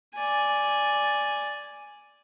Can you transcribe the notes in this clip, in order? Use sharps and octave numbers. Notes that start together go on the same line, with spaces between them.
D5 G#5